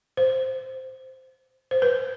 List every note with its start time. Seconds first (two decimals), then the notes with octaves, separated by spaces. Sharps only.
0.17 C5
1.71 C5
1.82 B4